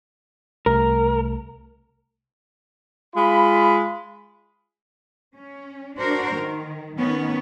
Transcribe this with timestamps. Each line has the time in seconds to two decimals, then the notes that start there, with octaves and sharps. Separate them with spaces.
0.66 C2 C3 A3 A#4
3.16 G#3 F4 B5
5.35 C#4
5.97 D4 F#4 A#4 C5
6.36 D#3
6.97 D#3 B3 C#4